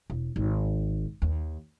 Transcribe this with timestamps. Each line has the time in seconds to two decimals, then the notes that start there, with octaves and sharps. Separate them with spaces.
0.10 E1
0.36 G#1
1.22 D#2